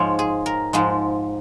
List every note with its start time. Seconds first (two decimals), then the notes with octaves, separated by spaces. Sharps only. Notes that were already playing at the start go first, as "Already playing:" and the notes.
Already playing: G#2 F3 G#3 C#5
0.19 G#4
0.46 A#4
0.73 G#2 F3 G#3